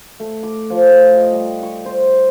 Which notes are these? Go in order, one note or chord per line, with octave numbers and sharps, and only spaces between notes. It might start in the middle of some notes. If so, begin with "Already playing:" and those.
A3
D6
F3
A2
D#5
G3
C#6
C5